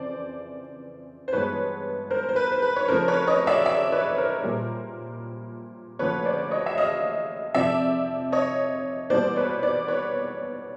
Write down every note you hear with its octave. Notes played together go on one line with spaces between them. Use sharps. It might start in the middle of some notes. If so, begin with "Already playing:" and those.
Already playing: F2 C#3 E3 C5 D5
C5
G2 E3 G#3 B3 B4 C#5
A#4 C5
C5
B4
C5
B4
C#5
F2 C#3 F3 A3 A#4 C5
B4 C#5
C#5 D#5
D5 E5
D5 E5
B4 C#5
A#4 C5
A#2 G3 A#3
D2 C#3 F3 A#3 B4 C#5
C5 D5
C#5 D#5
E5
D#5 F5
F2 C3 F3 D5 E5
C#5 D#5
E2 B2 G3 A#3 C5 D5
B4 C#5
C5 D5
B4 C#5